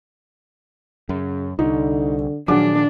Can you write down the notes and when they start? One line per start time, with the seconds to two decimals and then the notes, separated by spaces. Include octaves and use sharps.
1.09 F#2 C#3
1.59 C2 D3 D#4
2.48 A#2 D#3 F3 F#3 D4 G#4 F#5 D6